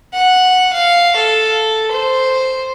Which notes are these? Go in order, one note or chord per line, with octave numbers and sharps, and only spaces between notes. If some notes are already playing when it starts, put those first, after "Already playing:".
F#5
F5
A4
C5